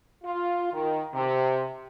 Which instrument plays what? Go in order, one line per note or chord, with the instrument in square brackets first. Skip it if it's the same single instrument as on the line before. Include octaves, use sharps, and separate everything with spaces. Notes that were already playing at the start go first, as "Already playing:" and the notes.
[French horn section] F4
D#3
C3